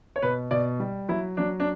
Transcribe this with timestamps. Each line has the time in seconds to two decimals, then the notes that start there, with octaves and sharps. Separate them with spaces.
0.16 C#5
0.22 B2 B4
0.51 B2 D5
0.80 G3
1.09 F#3 E4
1.37 F#3 D4
1.60 D4